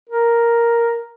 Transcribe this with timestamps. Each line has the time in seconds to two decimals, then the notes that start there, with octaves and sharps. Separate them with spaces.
0.10 A#4